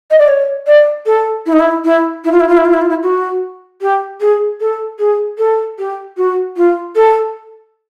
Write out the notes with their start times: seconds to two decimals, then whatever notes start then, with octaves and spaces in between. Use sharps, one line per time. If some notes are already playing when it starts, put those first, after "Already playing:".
0.11 D#5
0.19 D5
0.28 C#5
0.67 D5
1.06 A4
1.46 E4
1.53 D#4
1.59 E4
1.85 E4
2.25 E4
2.32 F4
2.40 E4
2.49 F4
2.57 E4
2.65 F4
2.74 E4
2.81 F4
2.89 E4
3.03 F#4
3.82 G4
4.21 G#4
4.61 A4
4.99 G#4
5.38 A4
5.79 G4
6.17 F#4
6.57 F4
6.96 A4